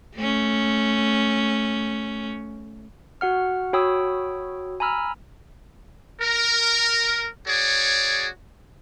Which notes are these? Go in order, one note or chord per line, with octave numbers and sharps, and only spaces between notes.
A3 C#4
F#4 F#5 F6
F#4 C#5 G5 B5 D#6 E6
G#5 A#5 B5 E6 F6
A#4
F#4 G#4 C#5 D5